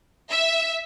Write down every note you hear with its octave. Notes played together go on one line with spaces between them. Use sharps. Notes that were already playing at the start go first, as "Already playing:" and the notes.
E5